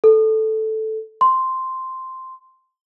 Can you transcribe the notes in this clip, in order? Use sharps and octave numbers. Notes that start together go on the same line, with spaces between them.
A4
C6